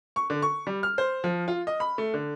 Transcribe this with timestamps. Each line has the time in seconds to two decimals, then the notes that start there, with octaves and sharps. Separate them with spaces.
0.16 C#6
0.30 D3
0.42 C#6
0.67 G3
0.83 F6
0.98 C5
1.24 F3
1.48 F4
1.67 D#5
1.80 B5
1.98 A3
2.14 D3